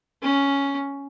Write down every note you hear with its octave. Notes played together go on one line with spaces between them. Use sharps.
C#4